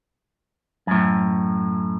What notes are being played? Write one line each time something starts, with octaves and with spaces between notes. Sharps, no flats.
F#2 A2